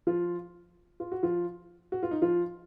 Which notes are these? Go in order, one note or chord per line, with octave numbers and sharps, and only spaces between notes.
F3 F4
F4
F#4
F3 F4
F#4
F4
D#4
F3 F4